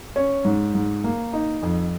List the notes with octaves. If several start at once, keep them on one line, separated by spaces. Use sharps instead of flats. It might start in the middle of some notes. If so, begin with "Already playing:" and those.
C#4 C#5
G#2
G#2
A#3
D#4
F2